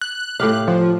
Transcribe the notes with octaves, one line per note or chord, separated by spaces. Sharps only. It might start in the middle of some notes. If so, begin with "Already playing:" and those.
F#6
A2 G4 F5
F3